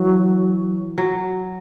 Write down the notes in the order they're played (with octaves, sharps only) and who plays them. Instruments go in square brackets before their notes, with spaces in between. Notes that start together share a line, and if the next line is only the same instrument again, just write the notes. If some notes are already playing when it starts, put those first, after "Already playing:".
Already playing: [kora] E3 [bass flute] F#3
[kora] F#3